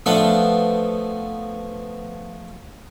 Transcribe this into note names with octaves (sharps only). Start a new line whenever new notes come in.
F3 A3 B3 D4 C5